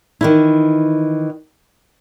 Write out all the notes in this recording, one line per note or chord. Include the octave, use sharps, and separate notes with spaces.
D#3 E3 E4